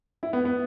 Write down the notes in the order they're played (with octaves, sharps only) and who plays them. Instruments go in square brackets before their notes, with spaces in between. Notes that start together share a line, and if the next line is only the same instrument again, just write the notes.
[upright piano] E4
B3
B3